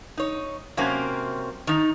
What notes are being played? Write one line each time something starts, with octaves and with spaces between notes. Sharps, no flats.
D#4 C#5
C3 F#3 A#3 C4 C#4
D#3 D#4